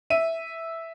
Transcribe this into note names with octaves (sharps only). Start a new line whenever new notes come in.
E5 D#7